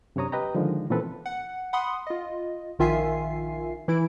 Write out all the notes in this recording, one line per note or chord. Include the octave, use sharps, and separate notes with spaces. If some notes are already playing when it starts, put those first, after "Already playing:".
F#2 C3 D4 C#5 A#5 D#6
G4 B4 D#5 G5 A#5
D3 D#3 F3 G#3
A#2 E3 C4 C#4 A4 B4
F#5
F#5 B5 C6 D#6
F4 D#5
A#1 D#3 F4 E5 G#5 C7
E3 E4 D7